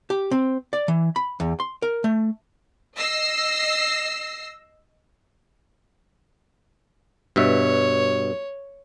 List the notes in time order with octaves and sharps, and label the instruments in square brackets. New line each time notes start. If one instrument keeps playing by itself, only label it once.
[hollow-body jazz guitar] G4
C4
D5
E3
B5
E2
C6
A#4
A3
[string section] D#5 E6 A#6 C7
[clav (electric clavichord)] G2 B2 E5 [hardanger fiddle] C#5